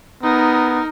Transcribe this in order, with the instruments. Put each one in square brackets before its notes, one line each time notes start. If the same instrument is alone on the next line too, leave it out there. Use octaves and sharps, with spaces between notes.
[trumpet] B3 [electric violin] D#4 A#4